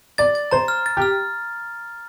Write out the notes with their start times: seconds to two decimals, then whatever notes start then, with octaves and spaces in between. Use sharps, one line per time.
0.18 D5 A6
0.35 A6
0.51 C5 A#5
0.68 F6
0.86 A6
0.97 G4 F6